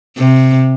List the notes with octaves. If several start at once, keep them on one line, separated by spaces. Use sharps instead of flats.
C3